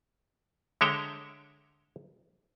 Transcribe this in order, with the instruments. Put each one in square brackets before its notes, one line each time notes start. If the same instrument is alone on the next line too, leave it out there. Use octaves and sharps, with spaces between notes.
[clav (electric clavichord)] D3 G#3 C#5 E5 G5 A#5